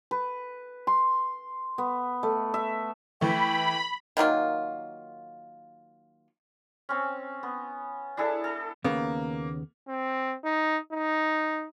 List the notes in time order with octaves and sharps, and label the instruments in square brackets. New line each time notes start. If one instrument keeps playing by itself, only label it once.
[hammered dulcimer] B4
C6
B3
A3
E5
[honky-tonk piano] E3 A3 [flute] G5 [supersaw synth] B5
[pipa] D#3 F#3 A#3 F4
[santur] C4 C#4
B3
D4 E4 G#4 A4
A4
[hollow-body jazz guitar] D#2 C#3 B3 [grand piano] A#3
[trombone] C4
D#4
D#4